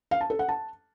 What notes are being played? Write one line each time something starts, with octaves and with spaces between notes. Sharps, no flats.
F5
A5
A4
F#5
A5